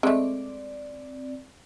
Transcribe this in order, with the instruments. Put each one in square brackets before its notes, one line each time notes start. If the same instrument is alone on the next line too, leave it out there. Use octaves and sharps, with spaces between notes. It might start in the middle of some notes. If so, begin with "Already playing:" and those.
[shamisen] G#3 A3 [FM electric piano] C4 D5